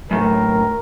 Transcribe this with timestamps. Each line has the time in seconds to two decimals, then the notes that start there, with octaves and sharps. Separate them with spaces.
0.11 F#2 A2 A#4